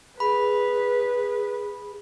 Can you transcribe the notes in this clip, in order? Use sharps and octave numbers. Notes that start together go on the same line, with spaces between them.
G#4 B4 B5